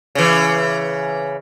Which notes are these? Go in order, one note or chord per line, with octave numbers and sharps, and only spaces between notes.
C#3 E3